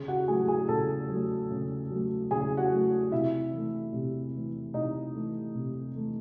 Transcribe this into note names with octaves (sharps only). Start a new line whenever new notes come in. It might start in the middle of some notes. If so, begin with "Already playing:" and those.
Already playing: C#3 G#4
F#4 F#5
F#3 A3 G#4 G#5
G#4 G#5
C#3 A4 A5
F#3 A3
C#3
F#3 A3
C#3 G#4 G#5
F#4 F#5
F#3 A3
C3 E4 E5
E3 A3
C3
E3 A3
C3 D#4 D#5
E3 A3
C3
E3 A3